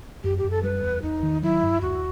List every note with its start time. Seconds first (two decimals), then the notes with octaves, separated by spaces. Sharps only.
0.24 F#2 G4
0.38 G4
0.44 F#2
0.50 A4
0.63 G3 B4
0.83 E2
1.03 E2 D#4
1.23 D#3
1.42 F#3 E4
1.63 G2
1.81 D#2 F#4